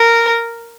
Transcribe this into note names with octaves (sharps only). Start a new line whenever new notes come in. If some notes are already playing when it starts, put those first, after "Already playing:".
Already playing: A#4